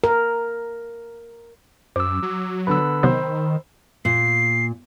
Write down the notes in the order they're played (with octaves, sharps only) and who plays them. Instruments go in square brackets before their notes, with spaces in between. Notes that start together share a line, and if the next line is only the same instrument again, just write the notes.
[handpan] A#4
[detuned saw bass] F#2 [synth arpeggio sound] C5 [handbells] D6 E6
[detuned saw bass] F#3
[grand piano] D3 B3 [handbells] B5 E6
[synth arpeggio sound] C3 F#3 B3 [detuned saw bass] D#3 [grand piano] C5
[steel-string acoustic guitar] A#2 [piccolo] C7